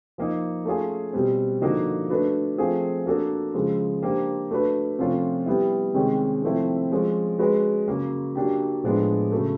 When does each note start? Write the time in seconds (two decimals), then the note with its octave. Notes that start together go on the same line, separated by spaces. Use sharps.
0.18 F3 A#3 D#4
0.65 A3 C#4 F4 G#4
1.13 B2 G3 C4
1.62 D3 F3 A#3 D#4 F#4
2.10 A3 D4 F#4 B4
2.58 F3 A3 C4 F4 G#4
3.06 A#3 D4 F#4 A4
3.54 C#3 F3 G#3
4.03 A#3 D4 G4 C5
4.51 A3 D4 F#4 B4
4.99 C3 F3 A3 C#4 F4
5.46 G3 B3 E4
5.94 C3 D#3 G#3 C#4
6.42 C3 F3 A3 C4 E4
6.91 F3 G#3 C#4
7.39 G#3 C#4 F#4 B4
7.88 C#3 F#3 A#3
8.35 F#3 A#3 D4 G4
8.83 A2 F3 G#3 B3 D4
9.32 C#3 F#3 A3